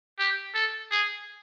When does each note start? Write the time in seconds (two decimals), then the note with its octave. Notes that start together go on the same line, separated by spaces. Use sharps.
0.19 G4
0.54 A4
0.91 G#4